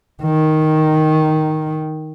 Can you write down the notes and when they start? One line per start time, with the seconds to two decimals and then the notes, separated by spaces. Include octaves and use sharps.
0.22 D#3